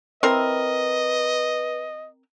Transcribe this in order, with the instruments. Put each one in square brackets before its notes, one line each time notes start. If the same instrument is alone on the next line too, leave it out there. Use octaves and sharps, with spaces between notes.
[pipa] C4 E4 A#4 [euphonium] B4 [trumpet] D#5